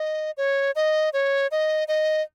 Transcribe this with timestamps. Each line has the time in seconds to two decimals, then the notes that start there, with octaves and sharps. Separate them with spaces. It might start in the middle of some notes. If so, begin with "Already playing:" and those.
Already playing: D#5
0.37 C#5
0.76 D#5
1.13 C#5
1.51 D#5
1.88 D#5